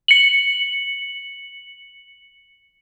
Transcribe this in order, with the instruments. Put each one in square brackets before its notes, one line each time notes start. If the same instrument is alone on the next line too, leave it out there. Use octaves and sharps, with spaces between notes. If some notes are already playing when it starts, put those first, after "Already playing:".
[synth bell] C#7 F#7